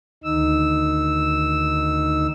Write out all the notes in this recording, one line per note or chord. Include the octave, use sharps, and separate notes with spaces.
D2 D#3 D#4 E6